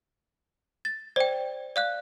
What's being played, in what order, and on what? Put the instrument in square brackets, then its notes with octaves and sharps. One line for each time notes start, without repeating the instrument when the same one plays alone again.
[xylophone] A6
[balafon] C5 [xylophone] D5 G5
[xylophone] D5 F5 F#6